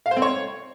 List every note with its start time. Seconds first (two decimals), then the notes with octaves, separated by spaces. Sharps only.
0.06 F5
0.11 C5
0.17 C4
0.22 C#5